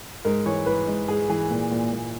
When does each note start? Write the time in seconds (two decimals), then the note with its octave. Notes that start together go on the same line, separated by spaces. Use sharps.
0.25 G#2 A#4
0.46 E3 C#5
0.66 E3 B4
0.87 G#2
1.08 G#2 G#4
1.29 E3 G#4
1.51 A#2
1.71 A#2
1.92 A#2